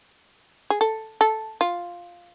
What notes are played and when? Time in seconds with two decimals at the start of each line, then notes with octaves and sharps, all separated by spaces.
0.70 G#4
0.81 A4
1.21 A4
1.61 F4